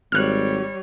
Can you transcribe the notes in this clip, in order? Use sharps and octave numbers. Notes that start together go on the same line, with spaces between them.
G#1 G3 C#5 F6 F#6